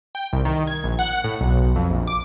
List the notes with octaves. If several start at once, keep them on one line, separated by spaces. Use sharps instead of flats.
G5
C2
D#3
G#6
A#1
F#5
A2
B1
F2
A#1
D6